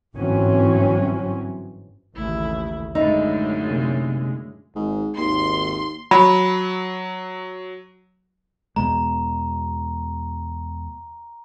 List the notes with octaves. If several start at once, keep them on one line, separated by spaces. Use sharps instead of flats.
G1 G#2 E3 F#3 C4 C#4
A1 D#2 C#3 E4
F#2 A2 D3 G#3 D#4 E5 B5 E6
C3 A#3
G#1 G#2
G#1 D#2 C6
F#3 B5
E2 B2 G#3 A#5